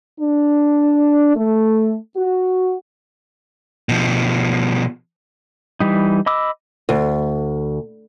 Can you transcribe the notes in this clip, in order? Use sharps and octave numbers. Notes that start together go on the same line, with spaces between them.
D4
A3
F#4
B2 F3
E3 G3 D#4
D#5 B5 D6 E6
D2